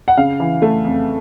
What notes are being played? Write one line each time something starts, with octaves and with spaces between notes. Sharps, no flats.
F#5
C#3 F5
E3
A3
F2